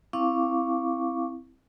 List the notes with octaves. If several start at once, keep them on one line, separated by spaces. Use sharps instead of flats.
C4 E4 F5 C#6 D6